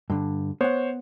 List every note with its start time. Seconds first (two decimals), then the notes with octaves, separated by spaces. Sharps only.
0.10 G2 D3
0.61 B3 C5 C#5 F#5